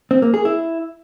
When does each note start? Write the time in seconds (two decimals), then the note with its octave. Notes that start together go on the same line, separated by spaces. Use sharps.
0.11 C4
0.22 A#3
0.34 G#4
0.45 E4